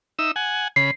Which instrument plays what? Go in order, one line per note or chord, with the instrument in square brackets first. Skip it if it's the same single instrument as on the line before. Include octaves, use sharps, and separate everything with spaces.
[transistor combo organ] D#4 E5 E6
F#5 G#5
[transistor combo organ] C#3 B5 [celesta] C7